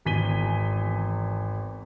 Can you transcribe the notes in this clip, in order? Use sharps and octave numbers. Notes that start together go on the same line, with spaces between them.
G#1 E2 G#5 B6 D#7 G7